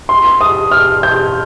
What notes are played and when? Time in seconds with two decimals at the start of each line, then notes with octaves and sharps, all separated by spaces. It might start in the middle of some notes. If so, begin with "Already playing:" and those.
0.09 C6
0.41 D#6
0.72 F6
1.03 G6